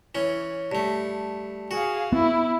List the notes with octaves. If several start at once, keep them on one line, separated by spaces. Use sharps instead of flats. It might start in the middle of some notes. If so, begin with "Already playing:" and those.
E3 C#4
G2 A3
F#4 G#4 F5
B3 E4